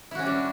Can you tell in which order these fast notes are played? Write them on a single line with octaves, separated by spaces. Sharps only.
E4 F#4 C#4 G3 D4